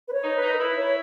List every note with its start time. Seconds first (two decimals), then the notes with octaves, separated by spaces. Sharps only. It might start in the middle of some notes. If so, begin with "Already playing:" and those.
0.08 B4
0.13 C#5
0.24 D#4
0.36 B4
0.42 D#4
0.53 A#4
0.59 E4 B4
0.76 C#5